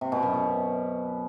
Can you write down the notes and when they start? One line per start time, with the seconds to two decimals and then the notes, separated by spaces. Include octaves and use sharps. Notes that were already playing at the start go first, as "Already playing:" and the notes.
0.01 C3
0.12 B2
0.23 F#2
0.33 B2